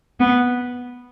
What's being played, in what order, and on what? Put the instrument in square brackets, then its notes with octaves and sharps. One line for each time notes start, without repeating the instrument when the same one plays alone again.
[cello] B3